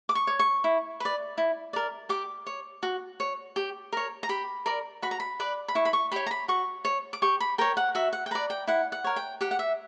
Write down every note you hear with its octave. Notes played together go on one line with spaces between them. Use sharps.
D6
C#6
C#5
C#6
E4
B4 D5
E4
A#4 D5
G4 D6
C#5
F#4
C#5
G4
A#4 C#5
A#5
G4 B5
A#4 D5
F#4 B5
A#5
B5
B4 D5
B5
E4 C#6
B5
C#6
G4 C#5 B5
A#5
B5
F#4 C#6
C#5
D6
G4 C#6
B5
A#4 C#5 G5
F#5
F#4 E5
F#5
G5
B4 D5 A#5
G5
E4 F#5
F#5
A#4 C#5
G5
G4 F#5
F#5
E5